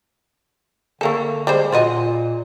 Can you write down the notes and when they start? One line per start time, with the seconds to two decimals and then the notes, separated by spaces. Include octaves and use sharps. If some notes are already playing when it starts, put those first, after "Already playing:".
1.01 D3 A3 A#3 A4
1.47 G3 G#3 C5
1.72 A#2 F4 F#4 D#5